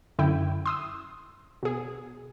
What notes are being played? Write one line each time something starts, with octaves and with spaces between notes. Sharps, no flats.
F#2 D3 E4 G5
C6 D#6 E6
B2 G#4